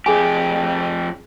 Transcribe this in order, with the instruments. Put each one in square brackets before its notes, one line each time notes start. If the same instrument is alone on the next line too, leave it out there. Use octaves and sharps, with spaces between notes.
[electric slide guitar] F2 G4 [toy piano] G#4 G#5